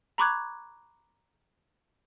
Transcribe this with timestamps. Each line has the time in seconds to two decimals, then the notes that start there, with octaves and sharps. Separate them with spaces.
0.18 A#5 B5 C#6 D6 F#6 G#6